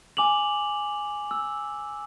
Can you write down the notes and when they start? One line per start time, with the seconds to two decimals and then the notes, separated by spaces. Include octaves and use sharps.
0.17 G#5 D6 F7 F#7
1.31 E6